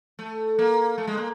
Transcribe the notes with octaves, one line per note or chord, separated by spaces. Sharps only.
A3
A#3
A3
G#3
A#3